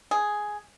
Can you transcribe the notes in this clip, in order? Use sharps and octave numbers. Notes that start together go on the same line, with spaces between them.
G#4